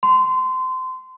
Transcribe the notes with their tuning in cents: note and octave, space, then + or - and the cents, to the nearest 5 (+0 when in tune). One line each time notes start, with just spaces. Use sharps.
C6 -25